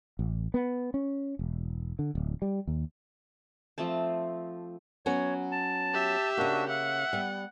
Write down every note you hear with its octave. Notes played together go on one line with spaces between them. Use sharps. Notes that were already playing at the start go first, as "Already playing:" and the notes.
A1
B3
C#4
E1
D3
D1
G3
D#2
F3 A3 C4 A5
F#3 B3 C#4 C#5
A5
G4 E5
C#3 A#3 D4 F#4
E5 F#5
G3 B3